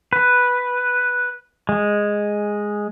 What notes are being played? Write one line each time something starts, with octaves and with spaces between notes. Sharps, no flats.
B4
G#3